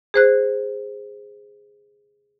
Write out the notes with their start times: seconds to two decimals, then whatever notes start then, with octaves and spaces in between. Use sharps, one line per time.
0.14 G#4 C5 F#6